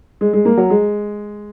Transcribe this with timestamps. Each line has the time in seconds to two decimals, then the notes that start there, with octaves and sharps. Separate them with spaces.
0.21 G#3
0.33 G#3
0.45 A#3
0.57 F#3
0.70 G#3